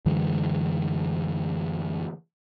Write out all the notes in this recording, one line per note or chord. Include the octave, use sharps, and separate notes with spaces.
F#2 D3 E3 G#3